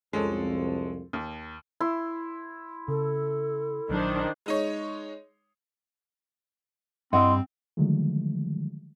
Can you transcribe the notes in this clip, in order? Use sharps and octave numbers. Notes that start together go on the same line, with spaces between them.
C2 F2 G#3 C#4 A4
D#2
E4 C6
C#3 A4
A#1 D#3 F3 F#3 D4 C5
G#3 D#4 C#5
G2 G3 C4 E4 D#5 F#5 C6
D3 D#3 F3 F#3 G#3 A3